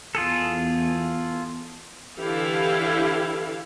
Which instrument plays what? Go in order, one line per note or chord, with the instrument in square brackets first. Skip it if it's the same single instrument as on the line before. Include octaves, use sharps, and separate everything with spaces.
[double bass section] E2 [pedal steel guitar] F4 G#4 A4
[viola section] D3 E3 E4 G4 A4 F5